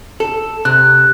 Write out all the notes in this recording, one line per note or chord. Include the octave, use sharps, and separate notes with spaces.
A4
C3 F#6